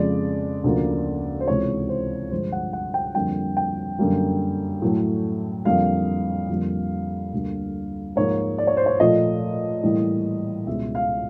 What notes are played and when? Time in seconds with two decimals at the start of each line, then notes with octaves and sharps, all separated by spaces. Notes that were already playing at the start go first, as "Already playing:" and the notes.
Already playing: F2 C#3 F3 G#3 D5
0.64 D2 C#3 F3 A#3
1.40 C5
1.48 C#2 C3 E3 G#3 C#5
1.89 C5
2.31 G2 D3 F3 G#3 C5
2.52 F#5
2.73 F#5
2.94 G5
3.15 F2 D3 G3 A#3 G5
3.57 G5
3.99 F#2 D3 G3 A#3
4.82 A2 F#3 A3
5.65 F2 D3 G3 A#3 F5
6.49 F2 D3 G3 A#3
7.33 D2 D3 G3 A#3
8.16 G#2 F3 A#3 C#5
8.58 D5
8.67 C#5
8.77 C5
8.86 C#5
9.00 A#2 F3 A3 D#5
9.83 A2 E3 G3 A#3
10.67 C#2 B2 G#3 E5
10.95 F5